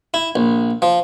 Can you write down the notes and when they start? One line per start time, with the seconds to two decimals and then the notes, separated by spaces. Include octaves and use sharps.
0.14 E4
0.36 A#1
0.82 F3